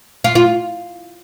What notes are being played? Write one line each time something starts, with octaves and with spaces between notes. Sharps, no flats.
F4
F4